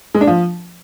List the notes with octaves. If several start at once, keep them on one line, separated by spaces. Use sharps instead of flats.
G#3
D4
F3